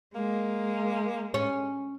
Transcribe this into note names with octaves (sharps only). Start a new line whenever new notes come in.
G#3 A#3
C#4